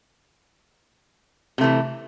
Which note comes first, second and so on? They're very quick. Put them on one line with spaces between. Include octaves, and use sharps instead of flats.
C3 A3 E3